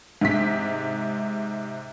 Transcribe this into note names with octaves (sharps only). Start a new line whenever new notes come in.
G#2 C3 B6